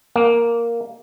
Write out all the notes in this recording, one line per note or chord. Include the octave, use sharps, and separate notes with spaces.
A#3